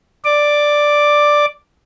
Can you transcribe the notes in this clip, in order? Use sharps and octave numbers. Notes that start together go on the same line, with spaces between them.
D5 D6